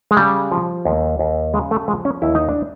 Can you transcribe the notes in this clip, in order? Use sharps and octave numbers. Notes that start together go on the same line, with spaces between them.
G#3
C#3 G3
F3
D#2
D#2
C#3 G#3
A3
F3 G#3
C#4
D#2 E4
D#4
D4